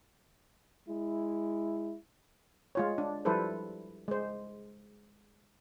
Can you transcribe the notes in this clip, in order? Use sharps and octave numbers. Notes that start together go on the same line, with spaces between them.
G#3 E4
G#3 F4 C#5
D4
F3 G3 E4 A4 B4 C5
G#3 C5